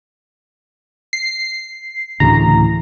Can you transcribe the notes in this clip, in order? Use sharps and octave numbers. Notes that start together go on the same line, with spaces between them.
C7
D2 A2 C#3 E3 A#5